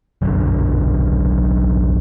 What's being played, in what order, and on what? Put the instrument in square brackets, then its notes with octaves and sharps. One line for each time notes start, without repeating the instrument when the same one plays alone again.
[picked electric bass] F#1 B1 F#2 D3